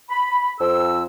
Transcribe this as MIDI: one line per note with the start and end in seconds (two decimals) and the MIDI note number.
0.09 0.51 83
0.59 1.03 41
0.59 1.03 88